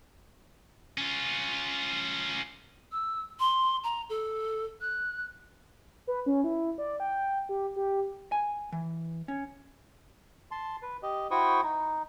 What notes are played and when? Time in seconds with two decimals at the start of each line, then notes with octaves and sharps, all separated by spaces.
0.98 C#4 F4
2.92 E6
3.40 C6
3.84 A#5
4.10 A4
4.81 F#6
6.07 B4
6.26 C#4
6.44 E4
6.78 D5
7.00 G5
7.49 G4
7.76 G4
8.32 G#5
8.72 E3
9.28 C#4
10.51 A5 C6
10.82 B4
11.02 G4 D#5
11.31 E4 F#4 C5 G5 C#6 D#6
11.63 D#4